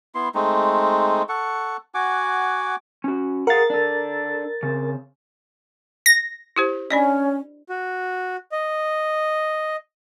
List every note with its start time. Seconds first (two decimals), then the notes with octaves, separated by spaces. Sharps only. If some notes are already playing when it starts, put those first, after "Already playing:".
0.15 B3 E4 C6
0.35 G#3 A3 C4 D#4
1.29 A4 F#5 C#6
1.94 F#4 F#5 G#5 D6
3.04 C#4 F#4
3.47 G#4 A#4 F5 F#5 A6
3.70 D4 A4
4.63 C#3 C4
6.06 A#6
6.56 E4 G4 C5
6.90 C#4 D4 D5 D#5
7.69 F#4
8.52 D#5